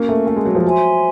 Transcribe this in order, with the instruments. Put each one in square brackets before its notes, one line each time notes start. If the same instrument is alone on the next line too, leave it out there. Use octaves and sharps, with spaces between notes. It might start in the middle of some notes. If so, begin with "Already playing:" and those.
Already playing: [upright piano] A#3 [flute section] C#4 F#4 A#4
[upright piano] A3
A3
G#3
F#3
F3
[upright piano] F#3 [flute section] C5 E5 G#5 C6